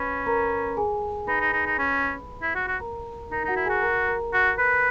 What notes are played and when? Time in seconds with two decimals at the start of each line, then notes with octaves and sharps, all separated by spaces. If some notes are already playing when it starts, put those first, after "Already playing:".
Already playing: C#4 B4 B5
0.26 A#4 A#5
0.77 G#4 G#5
1.27 D#4 B4 B5
1.40 D#4
1.53 D#4
1.66 D#4
1.79 C#4
2.42 E4
2.55 F#4
2.68 F#4
2.80 A#4 A#5
3.31 D#4 A#4 A#5
3.44 D#4 F#4 F#5
3.56 E4
3.66 F#4 G#4 G#5
3.82 A#4 A#5
4.08 A#4 A#5
4.33 F#4
4.59 B4